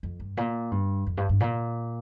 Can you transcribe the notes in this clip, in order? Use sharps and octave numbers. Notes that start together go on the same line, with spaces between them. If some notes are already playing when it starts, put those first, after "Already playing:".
F2
G2
A#2
G2
F2
G2
G2
A#2